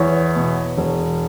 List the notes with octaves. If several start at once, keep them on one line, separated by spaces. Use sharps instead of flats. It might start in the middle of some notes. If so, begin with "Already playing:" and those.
Already playing: E2 C#5
B2
E1